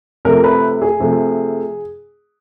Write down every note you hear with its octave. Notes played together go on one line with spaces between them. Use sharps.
C3 F3 A3 A#4
B4
G#4
C3 F3 A3